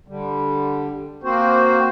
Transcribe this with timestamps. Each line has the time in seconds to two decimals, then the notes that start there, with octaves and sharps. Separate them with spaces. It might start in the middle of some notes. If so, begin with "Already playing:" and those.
0.08 D3 G3
1.23 A#3 C4 F#4 C5